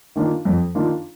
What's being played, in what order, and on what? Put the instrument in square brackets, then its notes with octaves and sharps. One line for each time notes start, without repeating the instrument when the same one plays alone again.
[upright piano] D#3 A#3 D4 F4
F2
D#3 A#3 D4 F4